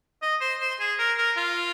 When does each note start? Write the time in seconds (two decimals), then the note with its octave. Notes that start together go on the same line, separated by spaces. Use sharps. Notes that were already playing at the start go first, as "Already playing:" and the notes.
0.22 D#5
0.41 C5
0.60 C5
0.80 G#4
0.99 A#4
1.18 A#4
1.37 F4